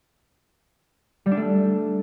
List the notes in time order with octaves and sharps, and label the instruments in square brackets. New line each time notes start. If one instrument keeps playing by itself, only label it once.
[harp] G3
D4
A3